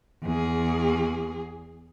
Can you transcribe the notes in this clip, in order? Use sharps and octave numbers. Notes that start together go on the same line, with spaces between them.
E2 G#4